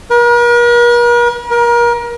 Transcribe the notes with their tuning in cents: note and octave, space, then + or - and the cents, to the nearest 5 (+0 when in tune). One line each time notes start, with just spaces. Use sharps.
A#4 +45
A#4 +30